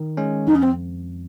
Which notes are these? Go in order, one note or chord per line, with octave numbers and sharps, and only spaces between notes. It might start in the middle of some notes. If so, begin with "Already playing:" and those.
Already playing: D#3
G#3 C#4
F2 D#4
C#4
C4